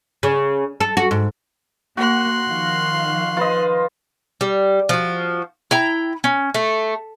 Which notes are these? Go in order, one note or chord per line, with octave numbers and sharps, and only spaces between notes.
C#3
A4
F#4
G#2
A#3 F#4 C6 F#6
D#3 F3 F5
F4 B4 C5 D#5
G3
F3 F#4
E4 G5 A#5
C#4
A3